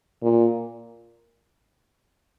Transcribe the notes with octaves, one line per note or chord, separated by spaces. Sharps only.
A#2